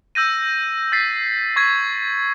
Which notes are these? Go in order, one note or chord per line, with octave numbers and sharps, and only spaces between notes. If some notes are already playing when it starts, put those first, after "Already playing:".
E6 G6 A#6 D#7
E6 A6 B6 C7
C#6 G#6 B6